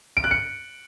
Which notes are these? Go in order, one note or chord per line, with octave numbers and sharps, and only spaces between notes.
D7
F#6
C#7